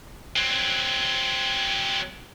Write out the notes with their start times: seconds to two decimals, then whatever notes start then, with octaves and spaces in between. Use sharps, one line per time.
0.36 F#3 C4